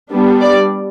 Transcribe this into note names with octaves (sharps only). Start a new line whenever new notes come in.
G3 B3 D4
D5